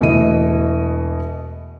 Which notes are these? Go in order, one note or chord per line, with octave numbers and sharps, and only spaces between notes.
E1 B2 E3 A3 D#5 D#7